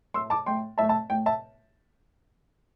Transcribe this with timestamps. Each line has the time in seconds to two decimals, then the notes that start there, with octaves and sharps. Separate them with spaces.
0.14 A2 A3 C6 E6
0.30 A5 D6
0.46 A2 A3 G5 C6
0.78 A2 E5 A5
0.83 A3
0.89 E5 A5
1.10 A2 A3 G5
1.26 E5 A5